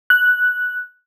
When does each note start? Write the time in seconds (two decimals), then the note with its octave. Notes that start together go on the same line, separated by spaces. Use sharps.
0.10 F#6